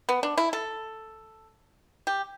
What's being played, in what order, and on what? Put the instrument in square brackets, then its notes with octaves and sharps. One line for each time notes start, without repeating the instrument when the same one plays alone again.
[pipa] B3
D4
E4
A4
G4